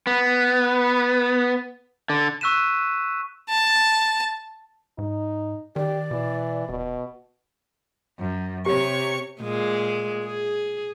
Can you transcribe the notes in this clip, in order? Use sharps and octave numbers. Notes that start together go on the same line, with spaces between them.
B3
D3
C#6 E6 F#6 B6 D#7 E7
A5
G#2 D#4
D#3 G4 D5
B2 E3
D#1 B2
F#2
C3 G4 C#5 C#6
A#2 G#3
G#4